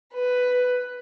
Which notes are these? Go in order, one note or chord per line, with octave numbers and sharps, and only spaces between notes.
B4